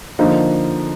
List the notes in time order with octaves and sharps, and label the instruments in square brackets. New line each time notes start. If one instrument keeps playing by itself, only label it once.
[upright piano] D3 F3 A#3 D#4